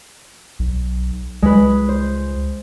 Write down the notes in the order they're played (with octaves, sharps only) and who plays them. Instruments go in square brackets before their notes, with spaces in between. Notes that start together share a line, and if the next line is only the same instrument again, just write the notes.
[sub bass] B1
[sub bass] C#2 [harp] G#3 B4
[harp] C5